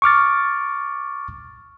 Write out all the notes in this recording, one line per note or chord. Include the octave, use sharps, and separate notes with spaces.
C#6 D6 F6 A6